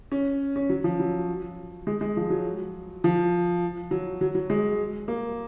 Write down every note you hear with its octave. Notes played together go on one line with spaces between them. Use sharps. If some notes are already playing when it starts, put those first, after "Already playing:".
C#4
C#4
F#3
F3
F#3
G#3
G#3
F3
F#3
F3
F#3
F#3
F#3
G#3
A#3